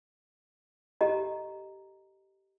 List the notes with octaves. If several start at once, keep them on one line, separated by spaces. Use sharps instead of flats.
G4 A4 D#5 A#5